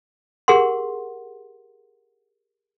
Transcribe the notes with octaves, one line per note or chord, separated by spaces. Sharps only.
G4 G#4 A#4 F#5 C6